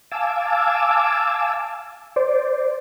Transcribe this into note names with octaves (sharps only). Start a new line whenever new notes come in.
F5 G#5 A5 D6 E6
C5 D5